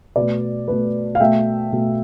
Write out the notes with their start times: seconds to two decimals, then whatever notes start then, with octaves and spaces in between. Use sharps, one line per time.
0.16 B2 A3 B4 D5
0.68 B2 A3 B4
1.15 F5
1.20 B2 A3 E5 G5
1.72 B2 A3